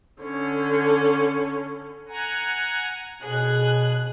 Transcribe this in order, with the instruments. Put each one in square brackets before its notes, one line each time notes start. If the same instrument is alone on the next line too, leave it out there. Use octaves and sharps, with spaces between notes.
[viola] D3 C#4
[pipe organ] F#5 G#5 A#5
[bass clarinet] B2 [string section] G#4 [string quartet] F#6